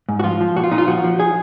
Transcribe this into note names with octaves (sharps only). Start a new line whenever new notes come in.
G#2
F#4
F3 F4
F3
A#2 F#4
F4
A#2 D#4
F4
F3 F#4
F3
G#4